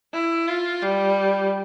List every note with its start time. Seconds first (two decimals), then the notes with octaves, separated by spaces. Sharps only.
0.14 E4
0.48 F4
0.82 G3